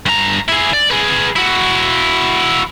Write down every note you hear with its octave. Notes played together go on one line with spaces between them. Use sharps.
G2 A#5
E4 G#4
D5
G#4 B4
E4 F#4